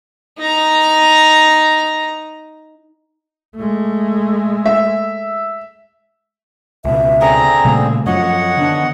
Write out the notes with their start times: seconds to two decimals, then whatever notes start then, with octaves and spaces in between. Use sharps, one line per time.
0.38 D#4 A#5
3.56 G#3 A3
4.66 E5
6.85 C#2 B2 E5
7.21 D3 C4 G#4 A#5
7.65 A#2 C#3 G3 A3
8.06 F#2 F3 C#5 D#5 F#5
8.57 D3 D#3 B3 D4